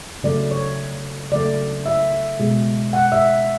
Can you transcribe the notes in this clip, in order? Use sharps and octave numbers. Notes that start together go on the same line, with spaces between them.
C#3 F#3 A3 D5
C#5
C#3 F#3 A3 D5
E5
B2 G#3
F#5
E5